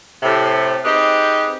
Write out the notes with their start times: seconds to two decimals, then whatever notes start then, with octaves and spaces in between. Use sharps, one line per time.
0.22 A2 C3
0.84 C4 D#4 G4 G#4 B4